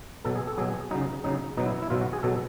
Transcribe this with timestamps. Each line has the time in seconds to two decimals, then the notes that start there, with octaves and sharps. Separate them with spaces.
0.25 B2 F#3 A4
0.36 G#4
0.47 A4
0.58 B2 F#3 G#4
0.68 G#4
0.91 C#3 F#3 D#4
1.24 C#3 F#3 D#4
1.57 B2 F#3 D#4
1.66 E4
1.82 E4
1.90 B2 F#3 F4
2.01 F#4
2.13 G#4
2.23 B2 F#3 A4